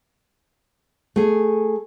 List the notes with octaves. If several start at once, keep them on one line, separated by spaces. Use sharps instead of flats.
A3 G#4